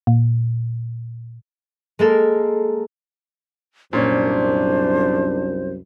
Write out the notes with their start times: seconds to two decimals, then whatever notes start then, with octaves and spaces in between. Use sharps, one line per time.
0.07 A#2
1.99 G#3 A#3 A4 A#4
3.93 C2 F#2 A#2 C#4 D4 C5